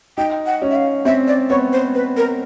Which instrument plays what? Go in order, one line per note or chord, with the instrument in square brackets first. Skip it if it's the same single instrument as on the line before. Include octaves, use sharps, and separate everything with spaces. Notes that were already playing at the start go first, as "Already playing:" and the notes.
[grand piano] D#4 [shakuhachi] G5
[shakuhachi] F#5
[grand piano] C#4
[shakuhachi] E5
F5
[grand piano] C4 [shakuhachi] E5
[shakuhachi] D5
[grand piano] B3 [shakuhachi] C#5
[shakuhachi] C5
B4
A#4